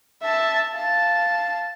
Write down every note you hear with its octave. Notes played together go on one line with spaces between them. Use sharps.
E5 A5
F5 A5